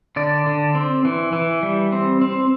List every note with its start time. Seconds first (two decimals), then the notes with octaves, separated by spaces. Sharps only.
0.16 D3 D5
0.47 D3
0.75 C4
1.05 E3
1.33 E3
1.63 G3
1.92 C4
2.21 C4